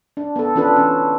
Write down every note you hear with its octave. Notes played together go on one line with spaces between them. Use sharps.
D4
B3 A4
E3 C#4 D4 F4 A4 B4
C#4